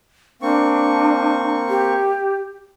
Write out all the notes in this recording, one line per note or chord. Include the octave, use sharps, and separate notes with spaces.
A#3 C4 D4 C#6
G4